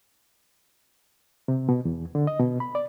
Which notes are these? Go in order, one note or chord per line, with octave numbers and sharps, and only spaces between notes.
C3
B2
E2
D3
D#5
B2
B5
D5